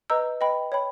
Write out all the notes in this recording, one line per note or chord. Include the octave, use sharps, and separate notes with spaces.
B4 D#5 A#5 E6 G6
B4 D#5 G5 B5
C#5 G5 B5